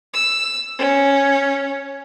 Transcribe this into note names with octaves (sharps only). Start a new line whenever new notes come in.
E6
C#4